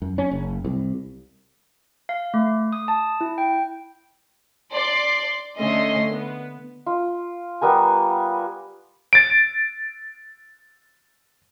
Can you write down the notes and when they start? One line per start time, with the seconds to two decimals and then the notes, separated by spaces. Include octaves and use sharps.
0.02 F#2
0.18 C#4
0.31 F#1
0.65 C2
2.09 F5
2.34 A3
2.73 D#6
2.88 A5
3.21 E4
3.38 G5
4.73 D5 C6
5.59 D3 A3 C#4 D#5 C6
6.12 B3
6.86 F4
7.61 G3 B3 A#4 G#5
9.13 A6 D7